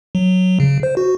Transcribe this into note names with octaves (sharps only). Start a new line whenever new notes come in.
F#3
C#3
C5
F#4